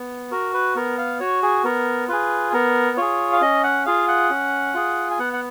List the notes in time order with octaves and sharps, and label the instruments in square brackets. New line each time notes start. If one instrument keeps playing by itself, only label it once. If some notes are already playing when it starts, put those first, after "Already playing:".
Already playing: [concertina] B3
F#4 A#4
B4
B3 A#4
F5
F#4 C#5
G#4
B3 A#4
F4 G#4 B4
B3 A#4
F4 G#4 C#5
F5
C#4 D#5
F#5
F4 G#4 F5
F#5
C#4
F4 G#4
G#5
B3 F#5
F#5